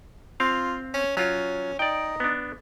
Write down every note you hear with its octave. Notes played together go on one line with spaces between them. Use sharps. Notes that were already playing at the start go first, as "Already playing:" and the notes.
C4 F4 F5
C#4
F#3 C#4 F4
D#4 D5 G5
B3 D4